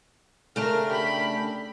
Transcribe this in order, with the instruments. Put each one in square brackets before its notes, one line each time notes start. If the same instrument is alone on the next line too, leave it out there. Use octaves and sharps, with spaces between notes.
[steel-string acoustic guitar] C#3 A3 D4 [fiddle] A#4 F6
[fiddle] G4 B5